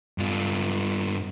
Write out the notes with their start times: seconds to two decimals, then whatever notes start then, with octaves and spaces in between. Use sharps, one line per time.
0.18 G2 F4